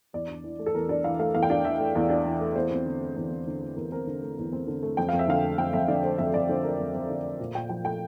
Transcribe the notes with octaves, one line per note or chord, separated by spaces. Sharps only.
E2 D5
D4
E3
A3
A4
E2 A#4
D4 D5
E3 F5
A3 F5
E2 F5
G5
D4 F5
E3 E5
A3
E2 D5
D4
E3
A3
E2 C5
C4
D3
A3
E2
C4
D3
A3
E2 A#4
C4 A#4
D3
A3
E2
C4
D3
A3
F2 G5
F2 F5
E5
D3 F5
A3
F2 G5
F2 E5
D3 D5
A3 C5
F2 E5
F2 D5
D3 C5
A3 A#4
F2
F2
D3
A3
A#2
A#2 G5
F3 G5
A3 G5